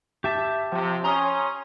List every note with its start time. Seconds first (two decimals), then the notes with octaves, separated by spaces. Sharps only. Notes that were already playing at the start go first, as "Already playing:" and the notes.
0.24 G4 E5 A5
0.72 C3 F3
1.04 C#4 A#5 C6 D#6